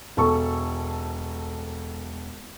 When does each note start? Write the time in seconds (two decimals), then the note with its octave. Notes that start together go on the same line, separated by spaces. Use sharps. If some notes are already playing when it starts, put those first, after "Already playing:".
0.17 E1 A4 C#6